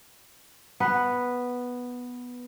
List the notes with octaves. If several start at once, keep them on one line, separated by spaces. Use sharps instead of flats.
B3 B4